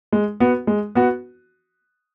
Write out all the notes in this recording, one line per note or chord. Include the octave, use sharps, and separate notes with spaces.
G#3
B3 F#4
G#3
B3 F#4